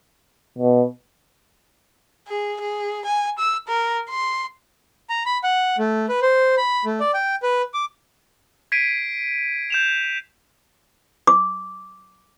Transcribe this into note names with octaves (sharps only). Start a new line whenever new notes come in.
B2
G#4
G#4
G#5
E6
A#4
C6
A#5
B5
F#5
A3
B4
C5
B5
A3
D5
G5
B4
D6
G#6 B6 C7 D7 D#7
G6 E7 F7
D6